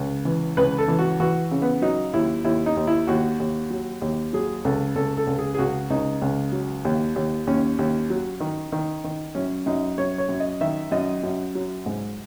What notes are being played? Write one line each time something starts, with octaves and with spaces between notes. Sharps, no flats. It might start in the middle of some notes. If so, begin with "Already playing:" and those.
Already playing: C#2
E3
C#2 B4
A4
E3
F#4
E3 F#4
C#3
B3
F#3 D#4
D#2 E4
D#2 E4
D#4
D#2
E4
D#2 F#4
D#2
F#3
D#2
F#3 G#4
C#2 A4
C#2 A4
A4
C#2
G#4
G#4
C#2 F#4
C#2 D#4
C#2
F#3
D#2
D#2
D#2 C#4
D#2
F#3
D#3
D#3
D#3
F#2 C#4
F#2 D#4
F#2 C#5
C#5
F#2
D#5
D#3 E5
F#2 D#5
F#2
F#3
G#2